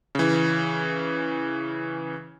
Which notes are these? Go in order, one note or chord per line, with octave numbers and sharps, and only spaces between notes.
C#3 E3